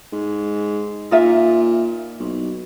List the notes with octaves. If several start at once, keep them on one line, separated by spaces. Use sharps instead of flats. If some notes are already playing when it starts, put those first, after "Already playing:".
G#2
A#2 D#4 F4 E5
B1